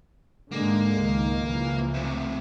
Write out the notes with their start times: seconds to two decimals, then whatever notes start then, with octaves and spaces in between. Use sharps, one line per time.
0.52 G#2 D3 G#3 A#3
1.00 C#2 D#3
1.45 C#2 E3 F3
1.94 A2 C3